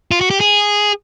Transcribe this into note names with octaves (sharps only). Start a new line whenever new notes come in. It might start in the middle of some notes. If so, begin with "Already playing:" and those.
F4
F#4
G4
G#4